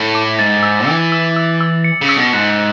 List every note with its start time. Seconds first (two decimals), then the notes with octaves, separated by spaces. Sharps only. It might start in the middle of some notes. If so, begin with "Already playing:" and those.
Already playing: A2
0.15 D6
0.39 G#2 A6
0.63 E6
0.87 E3 E6
1.12 E6
1.36 E6
1.61 E6
1.84 C#7
2.01 C#3
2.09 E6
2.16 B2
2.33 G#2 F#6